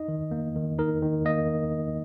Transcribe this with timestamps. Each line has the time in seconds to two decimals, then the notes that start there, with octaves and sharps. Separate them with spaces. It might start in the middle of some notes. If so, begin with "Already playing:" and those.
Already playing: D#4 D#5
0.08 D#3
0.31 A#3
0.56 D#3
0.79 D#4 A#4
1.02 D#3
1.25 A#3 D#5